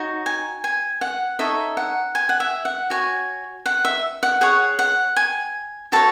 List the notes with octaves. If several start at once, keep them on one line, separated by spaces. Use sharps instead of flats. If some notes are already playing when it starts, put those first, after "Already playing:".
Already playing: D#4 F#4 C#5
G#5
G#5
F#5
D#4 A4 C#5 E5
F#5
G#5
F#5
E5
F#5
F#4 C#5 G#5
F#5
E5
F#5
G#4 C#5 F#5
F#5
G#5
F#4 A4 C#5 A5